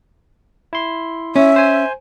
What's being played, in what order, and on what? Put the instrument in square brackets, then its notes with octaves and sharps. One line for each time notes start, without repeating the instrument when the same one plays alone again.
[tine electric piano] E4 C6
[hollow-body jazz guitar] C#4 [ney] E5
[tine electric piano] C5 G#5